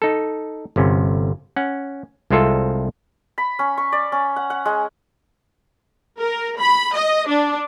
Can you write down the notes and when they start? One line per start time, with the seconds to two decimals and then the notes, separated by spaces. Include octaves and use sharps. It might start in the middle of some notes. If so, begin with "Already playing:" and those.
0.02 D#4 A4
0.76 G1 C3 C#4
1.56 C#4 F#5
2.31 C2 G#3 C4 F4 A4 E5
3.38 B5
3.59 C#4
3.78 C#6
3.92 D5
4.12 C#4
4.36 F#5
4.50 F#5
4.66 G#3
6.18 A#4
6.59 B5
6.94 D#5
7.27 D4